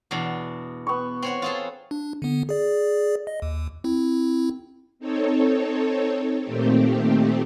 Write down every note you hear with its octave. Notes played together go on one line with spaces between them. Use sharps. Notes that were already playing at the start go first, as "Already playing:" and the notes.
E2 B2 D4
B3 C#6
C4 C#5 F#5
F4 G#4 A4
D4
D3 B3
G#4 D5
D#5
D#2
C4 E4
C4 D#4 A4 C#5
A#2 D#3 A3 C4 G4